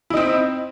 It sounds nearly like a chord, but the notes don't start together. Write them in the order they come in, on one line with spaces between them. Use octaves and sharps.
E4 D#4 C4